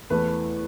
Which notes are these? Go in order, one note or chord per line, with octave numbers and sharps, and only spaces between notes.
E2 E3 A3 B4